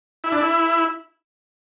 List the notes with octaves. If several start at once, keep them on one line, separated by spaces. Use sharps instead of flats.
E4
D4
E4